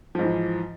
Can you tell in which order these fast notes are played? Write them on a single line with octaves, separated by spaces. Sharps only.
F3 G#2 E3